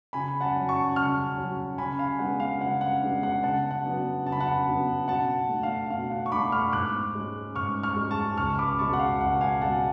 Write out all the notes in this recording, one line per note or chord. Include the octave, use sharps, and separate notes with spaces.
C#3 G#5 B5
F#5 A5
F#3 C#4
A5 C#6
C#3 C#6 F6
F#3 C#4
C#3 G#5 B5
F5 G#5
G#3 B3 D4 F#5
F5
C#3 F#5
F#5
G#3 B3 D4
F#5
C#3 F#5 A5
F#5
F#3 B3 D4
C#3 A5
B5
F#5 A5
F#3 B3 D4
B2 F#5 A5
A3 D4
F5
B2 F5
F#5
C#6
A3 D4 B5 D6
C#6 F6
G#2 D6 F#6
G#3 C#4
G#2 C#6 F6
C#6 F6
G#3
C#4
A5 C#6
C#2 C#6 F6
B5 D6
B2 G#3 A5 C#6
F#5
F5
C#2 F#5
F5 G#5
B2 G#3 F#5 A5